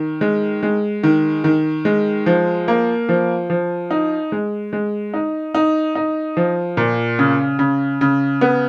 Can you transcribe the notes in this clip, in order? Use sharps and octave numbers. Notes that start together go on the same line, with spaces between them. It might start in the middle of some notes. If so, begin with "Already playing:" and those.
Already playing: D#3
G#3
G#3
D#3
D#3
G#3
F3
A#3
F3
F3
D#4
G#3
G#3
D#4
D#4
D#4
F3
A#2
C#3
C#3
C#3
B3